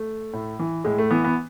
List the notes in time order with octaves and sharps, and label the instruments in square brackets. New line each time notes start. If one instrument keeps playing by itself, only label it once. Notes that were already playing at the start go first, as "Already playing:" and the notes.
Already playing: [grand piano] A3
A2
E3
A2 G#3
A3
E3 B3
B3